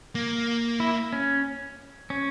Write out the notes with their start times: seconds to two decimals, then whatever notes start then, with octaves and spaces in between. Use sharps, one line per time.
0.15 A#3
0.80 E4
1.13 C#4
2.10 C#4